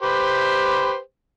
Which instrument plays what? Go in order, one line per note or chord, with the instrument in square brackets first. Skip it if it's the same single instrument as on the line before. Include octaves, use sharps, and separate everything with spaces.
[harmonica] G4 B4 C5